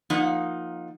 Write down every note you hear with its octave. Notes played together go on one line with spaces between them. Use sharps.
F3 A#3 D#4 F#5